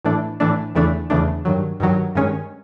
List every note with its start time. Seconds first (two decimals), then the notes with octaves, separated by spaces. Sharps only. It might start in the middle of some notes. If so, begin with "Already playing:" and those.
0.05 A2 E3 A3 D4
0.40 A2 E3 A3 D4
0.75 E2 C#3 E3 A3 D4
1.10 E2 C#3 E3 A3 D4
1.45 G2 D#3 F#3
1.80 G2 D#3 F#3
2.15 G2 D#3 G#3 C#4